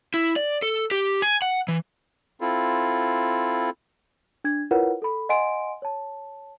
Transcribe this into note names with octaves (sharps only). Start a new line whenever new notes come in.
E4
D5
A4
G4
G#5
F#5
E3
C4 E4 F4 A4
D4 G#6
E4 F4 A#4 B4 C#5 F#5
A4 B5
D#5 F#5 G#5 C6 D7
C#5 A5